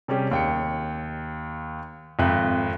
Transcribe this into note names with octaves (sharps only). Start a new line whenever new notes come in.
C3 G3 C#4 G4 G#4
D#2 G5 C#7
G#1 F2 E5 F#6